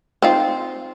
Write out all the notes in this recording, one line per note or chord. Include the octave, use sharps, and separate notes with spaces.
C4 D#4 F4